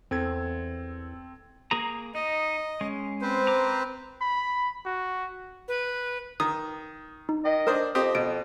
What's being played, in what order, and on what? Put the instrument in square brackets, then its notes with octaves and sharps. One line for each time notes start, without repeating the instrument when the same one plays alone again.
[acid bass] E2 [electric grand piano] C4 A4 G#6
[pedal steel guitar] A#3 G#4 A#5
[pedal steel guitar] D#4 [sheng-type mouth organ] D#5
[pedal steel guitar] G#3 C#4
[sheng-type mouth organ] C4 B4 C5
[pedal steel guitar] A#5 D6
[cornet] B5
F#4
[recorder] B4
[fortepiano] D#3 [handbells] D#6
[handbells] D#4
[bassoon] D#3 [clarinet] D#5
[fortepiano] D4 C5 D#6 [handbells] A#4
[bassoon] F2 [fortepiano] C4 G4 D#6 [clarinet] D#5
[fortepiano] B2 [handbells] D7